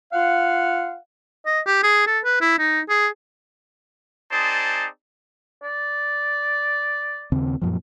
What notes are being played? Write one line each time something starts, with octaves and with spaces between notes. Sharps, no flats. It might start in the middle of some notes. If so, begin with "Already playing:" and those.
F4 F5 F#5
D#5
G4
G#4
A4
B4
E4
D#4
G#4
C4 D#4 G#4 C5 D5 A5
D5
D#2 C#3 C4
F#2 A#2 F3